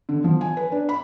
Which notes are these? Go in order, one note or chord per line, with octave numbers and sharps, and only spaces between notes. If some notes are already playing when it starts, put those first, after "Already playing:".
D3
F3
G#5
B4
D4
B5